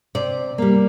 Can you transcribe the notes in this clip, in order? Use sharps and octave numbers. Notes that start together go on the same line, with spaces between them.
C3 D5
G3 A#3